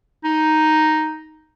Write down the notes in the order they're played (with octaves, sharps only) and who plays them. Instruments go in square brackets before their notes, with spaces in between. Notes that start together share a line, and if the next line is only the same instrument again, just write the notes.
[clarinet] D#4